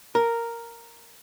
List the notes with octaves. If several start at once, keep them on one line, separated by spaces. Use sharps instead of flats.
A#4